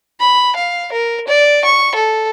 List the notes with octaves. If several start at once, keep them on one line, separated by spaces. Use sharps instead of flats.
B5
F5
A#4
D5
C#6
A4